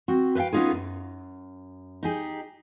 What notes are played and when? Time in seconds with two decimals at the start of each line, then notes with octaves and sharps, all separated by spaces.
0.08 C4 F#4
0.35 B4 C5 E5 F5 G5
0.53 B3 C#4 D#4 F4 G#4
0.71 F#2
2.03 D#4 G4 G#4